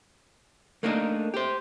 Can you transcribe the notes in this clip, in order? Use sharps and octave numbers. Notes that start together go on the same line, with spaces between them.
A3 A#3 D4 D#4 A#4
G4 C5